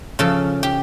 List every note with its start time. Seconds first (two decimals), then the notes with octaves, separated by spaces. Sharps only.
0.19 C#3 F3 A4
0.63 G4